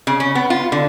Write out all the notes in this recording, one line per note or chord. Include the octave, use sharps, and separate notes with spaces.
C#3
C#4
B3
F4
D3